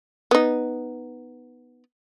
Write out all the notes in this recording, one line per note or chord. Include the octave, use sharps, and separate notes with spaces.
B3 D#4